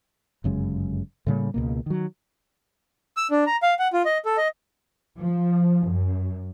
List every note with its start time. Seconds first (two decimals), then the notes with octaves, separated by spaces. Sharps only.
0.44 G1 F#2 C#3 G#3
1.27 A2 C#3 G3 A#3
1.54 C#2 B2 A#3
1.86 D#3 F#3
3.17 E6
3.31 D4
3.47 A#5
3.63 F5
3.79 F#5
3.93 F4
4.05 D#5
4.25 A4
4.37 D#5
5.18 F3
5.88 F#2